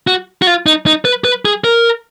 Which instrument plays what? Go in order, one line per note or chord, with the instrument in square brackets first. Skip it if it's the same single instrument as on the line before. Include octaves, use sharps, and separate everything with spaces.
[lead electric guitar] F#4
F#4
F4
D#4
D#4
B4
B4
G#4
A#4